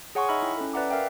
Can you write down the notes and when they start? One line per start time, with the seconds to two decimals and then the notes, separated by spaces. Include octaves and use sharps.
0.15 G#4 C#5 F#5 G#5 C6 C#6
0.29 D#4 D#5 E5 B5 E6 F6
0.42 E4 G5
0.57 C#4 A4
0.73 B4 D5 E5 F#5 A#5 D6
0.90 A#4 E5 F5 G5